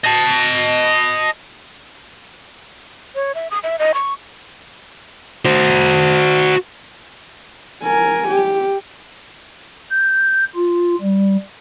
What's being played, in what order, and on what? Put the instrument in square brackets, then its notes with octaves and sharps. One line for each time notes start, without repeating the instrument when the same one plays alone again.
[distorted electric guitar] D#5 A5
[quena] C#5
E5
D#6
E5
D#5
C#6
[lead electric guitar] F#4 C5
[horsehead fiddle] A#4 G#5
G4
[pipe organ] G6
F4
G3